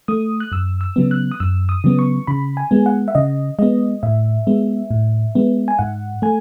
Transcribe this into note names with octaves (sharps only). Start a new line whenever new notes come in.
A3 D#6
F#6
F#2 E6
E6
C#3 F#3 B3
F#6
D#6
F#2 E6
D#6
C#3 F#3 B3
C#6
C#3 B5
G#5
G#3 B3
F#5
E5
C#3 D#5
G#3 B3 D#5
A2 E5
G#3 B3
A2
G#3 B3
G#5
G#2 F#5
A3 G#5